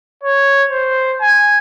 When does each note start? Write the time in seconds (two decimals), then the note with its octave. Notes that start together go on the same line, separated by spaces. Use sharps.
0.23 C#5
0.69 C5
1.21 G#5